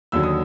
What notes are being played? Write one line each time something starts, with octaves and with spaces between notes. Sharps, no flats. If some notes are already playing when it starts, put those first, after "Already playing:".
D#2 D3 F#3 E6
D#6